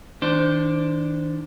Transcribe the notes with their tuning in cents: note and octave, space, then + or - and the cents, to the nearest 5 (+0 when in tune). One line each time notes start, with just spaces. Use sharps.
D#3 +40 D4 +0 C5 -10